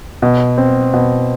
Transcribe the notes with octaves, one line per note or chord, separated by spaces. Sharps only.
B2
C4
B2